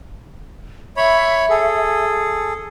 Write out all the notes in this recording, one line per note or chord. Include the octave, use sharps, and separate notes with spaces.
C#5 E5 B5
G#4 A4